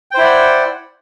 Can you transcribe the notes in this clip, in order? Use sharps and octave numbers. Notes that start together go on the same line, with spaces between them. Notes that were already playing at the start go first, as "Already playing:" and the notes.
E4 C5 D5 F#5 G5